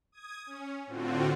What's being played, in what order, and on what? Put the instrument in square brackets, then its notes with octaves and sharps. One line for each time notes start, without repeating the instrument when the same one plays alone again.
[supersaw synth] D#6 G#6
C#4
A2 D3 C4 F4 F#4